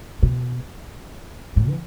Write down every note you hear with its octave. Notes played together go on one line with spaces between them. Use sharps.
B2
A2
E3